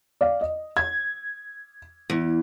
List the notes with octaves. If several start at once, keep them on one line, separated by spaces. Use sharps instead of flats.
D5 F5
D#5
G#6
E2